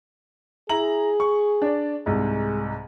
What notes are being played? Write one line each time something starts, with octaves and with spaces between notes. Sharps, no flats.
E4 G#4 A#5 F#7
C#6
D4 D5
C2 G#2 G#3